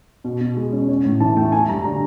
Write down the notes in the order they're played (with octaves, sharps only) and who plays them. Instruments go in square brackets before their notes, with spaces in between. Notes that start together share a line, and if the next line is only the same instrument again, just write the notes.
[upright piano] B2
B2
G#3
C#4
C#4
A2
E3 A5
A3 G5
A3 G#5
G2 A#5
D3 A#5